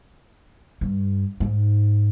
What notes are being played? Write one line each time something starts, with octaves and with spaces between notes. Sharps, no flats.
G2
G#2